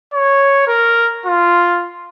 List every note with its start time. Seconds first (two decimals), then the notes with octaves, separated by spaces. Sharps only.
0.13 C#5
0.67 A#4
1.26 F4